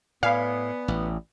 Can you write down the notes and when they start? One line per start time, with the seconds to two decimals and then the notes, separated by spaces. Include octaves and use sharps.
0.23 A2 B3 D5 F5 G#5 B5
0.88 A1